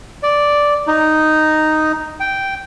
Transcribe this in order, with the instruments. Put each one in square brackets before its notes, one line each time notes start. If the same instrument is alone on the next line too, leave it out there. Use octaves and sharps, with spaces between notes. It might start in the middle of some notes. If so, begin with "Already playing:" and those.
[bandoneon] D5
D#4
G5